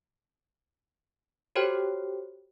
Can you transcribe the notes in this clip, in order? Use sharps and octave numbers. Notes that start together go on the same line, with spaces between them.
F#4 G4 A4 C5 C#5 G5